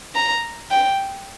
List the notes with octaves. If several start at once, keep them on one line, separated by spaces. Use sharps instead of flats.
A#5
G5